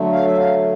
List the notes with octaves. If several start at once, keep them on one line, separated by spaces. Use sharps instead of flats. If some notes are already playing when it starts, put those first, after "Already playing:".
Already playing: D3 F#3 A3
F5
E5
F5